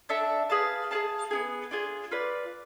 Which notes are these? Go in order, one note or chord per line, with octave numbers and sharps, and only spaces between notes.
D4 A4 E5 A5
G#4 B4 F5 A5
G#4 D5 F5 A5
B3 E4 G#4
D4 F4 G#4
F4 B4 D5